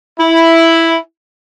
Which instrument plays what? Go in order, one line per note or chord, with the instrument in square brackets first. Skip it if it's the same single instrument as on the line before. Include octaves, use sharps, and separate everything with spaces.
[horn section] E4